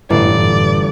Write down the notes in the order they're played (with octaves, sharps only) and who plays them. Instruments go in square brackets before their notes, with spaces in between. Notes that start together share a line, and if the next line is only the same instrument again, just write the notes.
[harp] G1 [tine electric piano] F#2 A2 [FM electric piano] E3 [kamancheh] D5